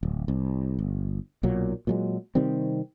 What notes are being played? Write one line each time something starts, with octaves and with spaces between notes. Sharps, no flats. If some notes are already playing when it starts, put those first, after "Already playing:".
D1
C2
G1
B1 A#2 F#3
A#2 F#3 G#3
C3 D#3 G3 C4